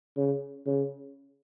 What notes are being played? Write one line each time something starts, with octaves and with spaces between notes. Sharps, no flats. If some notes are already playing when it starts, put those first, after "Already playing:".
C#3
C#3